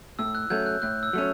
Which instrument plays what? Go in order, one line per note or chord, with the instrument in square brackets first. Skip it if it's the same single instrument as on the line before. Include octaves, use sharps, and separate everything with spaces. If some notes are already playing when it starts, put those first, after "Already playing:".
[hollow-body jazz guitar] A2 [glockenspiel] E6
[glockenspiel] F#6
[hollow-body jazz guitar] F#3 A3 C#4 [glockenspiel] G6
[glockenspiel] F#6
[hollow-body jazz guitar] A2 [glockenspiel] F#6
[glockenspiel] E6
[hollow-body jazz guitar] F#3 A3 C#4